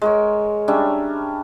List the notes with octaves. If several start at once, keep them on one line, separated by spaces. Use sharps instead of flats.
G#3 A#4 C#5
G3 C#4 D4 E5